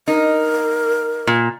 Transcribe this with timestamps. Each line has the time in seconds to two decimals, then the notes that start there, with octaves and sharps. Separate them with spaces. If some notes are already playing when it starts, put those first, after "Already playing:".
0.08 D#4 A#4
1.27 A#2